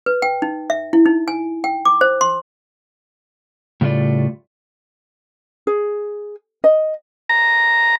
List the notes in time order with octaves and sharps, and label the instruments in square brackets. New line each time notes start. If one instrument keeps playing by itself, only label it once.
[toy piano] B4
G5
D#4
E5
E4
D#4
G#5
G5
D6
C5
C6
[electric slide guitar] A2 C#3 G3 A3 F4 D5
[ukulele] G#4
D#5
[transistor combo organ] A#5